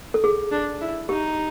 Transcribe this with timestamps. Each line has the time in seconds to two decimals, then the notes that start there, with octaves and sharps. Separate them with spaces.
0.14 A4
0.24 G#4
0.51 D4
0.81 E4
1.09 D#4 G4